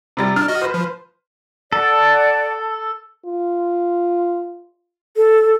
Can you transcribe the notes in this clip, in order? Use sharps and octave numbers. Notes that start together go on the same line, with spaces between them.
C3 G3 A6
D4 F6
F#4 D#5
B4 C5
F3
A4 D5 F#5 A5
F4
A4